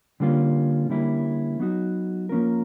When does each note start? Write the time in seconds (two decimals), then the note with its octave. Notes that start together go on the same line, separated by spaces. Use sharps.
0.20 D3 G3 A#3 C#4 F4
0.89 D3 G3 A#3 C#4 E4
1.60 F#3 B3 D#4 F#4
2.29 F3 A#3 C#4 F4 A#4